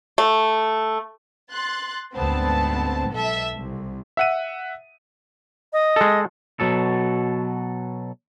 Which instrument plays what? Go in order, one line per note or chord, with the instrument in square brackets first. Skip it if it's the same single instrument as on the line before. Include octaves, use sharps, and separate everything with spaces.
[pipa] A3
[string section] C6 F#6 A6
D2 G#2 B3 C4 A5
B1 A4 E5
C2
[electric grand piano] E5 F#5 D#7
[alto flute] D#5
[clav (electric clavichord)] G#3 A4
[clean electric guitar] B2 F#3 A4